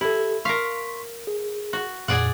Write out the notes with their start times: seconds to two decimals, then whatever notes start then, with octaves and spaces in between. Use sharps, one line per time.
0.01 E4 G4 A4
0.45 A#4 F5 C6 C#6 B6
1.27 G#4
1.73 F#4
2.08 F2 A#2 G#4 D5 F#5